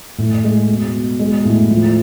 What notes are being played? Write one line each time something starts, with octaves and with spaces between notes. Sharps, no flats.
A2
G#3
B2
B2
G#3
A2
F3